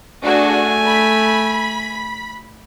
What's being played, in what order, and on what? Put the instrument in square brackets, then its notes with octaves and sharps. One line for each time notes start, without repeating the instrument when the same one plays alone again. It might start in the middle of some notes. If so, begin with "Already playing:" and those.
[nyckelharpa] A3 G#5 [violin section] D4 F#4 G#4
[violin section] B5 B6